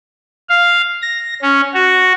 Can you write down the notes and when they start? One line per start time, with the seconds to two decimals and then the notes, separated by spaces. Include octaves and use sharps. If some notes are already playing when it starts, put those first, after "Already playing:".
0.49 F5
1.02 A#6
1.42 C#4
1.74 F#4